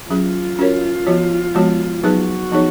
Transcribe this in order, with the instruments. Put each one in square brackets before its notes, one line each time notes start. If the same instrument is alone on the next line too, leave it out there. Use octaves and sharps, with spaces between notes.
[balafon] F#3 C#4 G#4 [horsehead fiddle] F4
[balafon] C#4 F#4 A#4 C#5
F3 B3 F#4 C#5
F3 G#3 B3 F#4 C#5
[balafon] F#3 B3 D#4 G#4 B4 [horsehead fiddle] F#4
[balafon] F3 B3 D#4 G#4 C#5